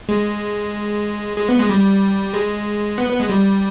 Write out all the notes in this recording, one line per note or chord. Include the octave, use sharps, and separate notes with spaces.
G#3
G#3
B3
G#3
G3
G#3
B3
B3
G#3
G3